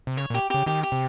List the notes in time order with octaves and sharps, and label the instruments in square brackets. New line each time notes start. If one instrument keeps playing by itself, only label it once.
[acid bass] C3
[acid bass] C#3 [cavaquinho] C#5
[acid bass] A#2
[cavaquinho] G4
[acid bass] C#3 [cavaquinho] G4
[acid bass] D#3 [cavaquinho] G4
[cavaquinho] G4
[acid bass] C3